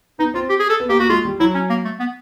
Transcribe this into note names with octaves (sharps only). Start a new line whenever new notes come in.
B3 D#4
C4 F4
G4
G#4
A4
B3
A#3 G4
A#3 F#4
G#3 F4
G3
F#3 E4
C#4
A#3
A3
B3